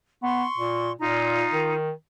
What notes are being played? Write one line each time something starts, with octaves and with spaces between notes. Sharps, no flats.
B3 C6 C#6
A#2
A#2 D#4 F4 A#5
D#3